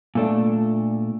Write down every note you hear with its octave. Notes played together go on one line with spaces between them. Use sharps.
A#2 A3 D4